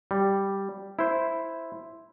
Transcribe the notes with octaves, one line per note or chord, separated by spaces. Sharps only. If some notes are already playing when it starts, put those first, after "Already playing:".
G3
E4 C5